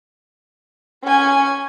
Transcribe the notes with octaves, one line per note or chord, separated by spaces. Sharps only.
C#4 G#5